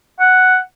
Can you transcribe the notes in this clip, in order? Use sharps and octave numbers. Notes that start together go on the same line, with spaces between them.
F#5